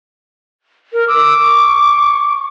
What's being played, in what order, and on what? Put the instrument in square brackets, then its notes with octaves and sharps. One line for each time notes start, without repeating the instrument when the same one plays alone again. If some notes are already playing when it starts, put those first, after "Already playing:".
[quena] A#4
[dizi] D6 [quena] E6
[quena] C#6